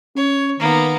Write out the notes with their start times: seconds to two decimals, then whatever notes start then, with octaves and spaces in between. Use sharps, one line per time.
0.16 C#4 C#5
0.60 D#3 A#3 B3